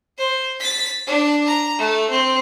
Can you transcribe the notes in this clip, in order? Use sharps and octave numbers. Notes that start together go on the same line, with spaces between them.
C5
A6 B6
D4
A#5
A3
C4